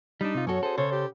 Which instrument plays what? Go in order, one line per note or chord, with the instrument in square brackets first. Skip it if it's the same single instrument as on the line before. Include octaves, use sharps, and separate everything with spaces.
[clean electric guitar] G3 D4 [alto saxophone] D#4
[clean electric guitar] C3 F4
[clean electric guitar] F#2 A4 [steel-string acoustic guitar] C#4 F#4 [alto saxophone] C#5
[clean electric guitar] G#4 A4 [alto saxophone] C5
[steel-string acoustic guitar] C#3 [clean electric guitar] A4 C5 [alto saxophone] C#5
[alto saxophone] G4